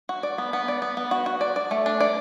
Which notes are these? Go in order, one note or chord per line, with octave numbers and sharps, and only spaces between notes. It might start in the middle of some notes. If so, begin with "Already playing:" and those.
F#4
D5
B3
B3
D5
B3
B3
F#4
F#4
D5
D5
A3
D4
D5